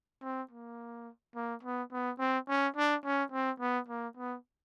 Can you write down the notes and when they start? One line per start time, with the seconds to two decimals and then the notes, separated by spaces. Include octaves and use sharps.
0.23 C4
0.51 A#3
1.35 A#3
1.63 B3
1.92 B3
2.19 C4
2.48 C#4
2.76 D4
3.04 C#4
3.32 C4
3.60 B3
3.88 A#3
4.17 B3